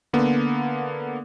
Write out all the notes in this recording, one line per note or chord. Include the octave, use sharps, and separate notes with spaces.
D3 A#3 B3